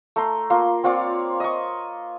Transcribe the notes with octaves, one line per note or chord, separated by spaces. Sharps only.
A3 A#5 C6
A#3 F4 C6
C4 F4 C#5 D5
D#5 C#6